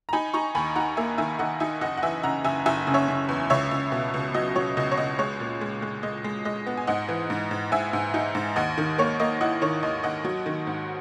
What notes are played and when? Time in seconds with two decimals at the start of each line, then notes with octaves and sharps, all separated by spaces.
0.09 A#5
0.13 D#4 G#5 B5
0.34 D#4 A#5 C#6
0.55 D#2 G#5 B5
0.76 D#4 F#5 A#5
0.97 A#3 E5 G#5
1.18 D#3 E5 G#5
1.39 D#3 D#5 F#5
1.60 D#4 E5 G#5
1.81 F#1 D#5 F#5
1.98 F#5
2.02 E3 E5 G#5
2.23 C#3 F#5 A#5
2.45 F#1 E5 G#5
2.66 F#1 E5 G#5
2.87 C#3
2.94 C#5 E5
3.08 C#3
3.29 E2
3.50 C#2 C#5 E5
3.71 C#2
3.92 B2
4.14 C#2
4.34 F#3 D#5
4.56 F#3 C#5
4.77 C#2 D#5
4.92 C#5
4.97 C#2 D#5
5.19 G#3 C#5
5.40 A#2
5.61 G#3
5.82 G#3
6.03 G#3 D#5
6.24 G#3
6.45 G#3 D#5
6.67 B3
6.77 G#5
6.87 G#2 D#5 F#5
7.08 E3
7.30 G#2
7.51 G#2
7.72 G#2 E5 G#5
7.93 G#2
8.14 D#4
8.35 G#2
8.56 D#2 D#5 F#5
8.78 D#3
8.98 A#3 C#5
9.20 A#3 D#5
9.41 E4 D#5 F#5
9.62 D#3 C#5
9.83 D#2 D#5
10.03 D#2 D#5 F#5
10.25 F#3
10.46 D#3
10.67 G#2